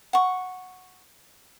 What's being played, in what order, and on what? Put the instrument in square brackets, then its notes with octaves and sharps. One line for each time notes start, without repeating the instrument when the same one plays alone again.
[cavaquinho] F#5 C#6